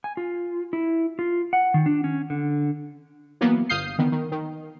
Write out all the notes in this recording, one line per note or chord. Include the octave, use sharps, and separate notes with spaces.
G#5
F4
E4
F4
F#5
D#3
D4
C#4
D3
E3 F#3 A#3 B3
G1 F5 D#6 G6 C7
D3 D#3 B3
D#3
D#3